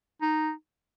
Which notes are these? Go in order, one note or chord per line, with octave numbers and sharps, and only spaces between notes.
D#4